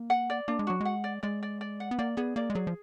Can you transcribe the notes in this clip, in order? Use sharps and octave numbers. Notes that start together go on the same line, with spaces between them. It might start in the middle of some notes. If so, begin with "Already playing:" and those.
Already playing: A#3
F#5
D5
A#3 D4
G#3
F#3 F#4
G#3 F#5
D5
G#3 D5
D5
D5
F#5
B3
A#3 D5
B3 G#4
A#3 D5
G#3
F#3 G#4
F3